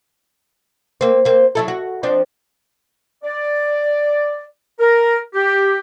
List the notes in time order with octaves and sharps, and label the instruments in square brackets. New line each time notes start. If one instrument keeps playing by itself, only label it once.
[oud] A#3 C4
A#3 C4
F#3 E4 A4
F#4
F3 C4 D4
[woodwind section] D5
A#4
G4